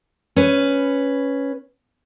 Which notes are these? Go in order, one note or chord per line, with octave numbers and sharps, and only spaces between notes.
C#4 B4